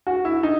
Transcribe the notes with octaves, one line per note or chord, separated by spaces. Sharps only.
F#4
E4
D#4